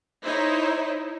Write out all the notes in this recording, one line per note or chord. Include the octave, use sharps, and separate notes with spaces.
D#4 E4 C5 C#5